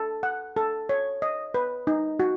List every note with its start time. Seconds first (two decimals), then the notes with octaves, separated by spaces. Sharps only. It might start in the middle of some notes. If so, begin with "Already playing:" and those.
Already playing: A4
0.23 F#5
0.56 A4
0.89 C#5
1.22 D#5
1.54 B4
1.87 D#4
2.20 F#4